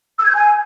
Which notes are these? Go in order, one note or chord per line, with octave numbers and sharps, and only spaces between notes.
E6
G#6
G6
G#5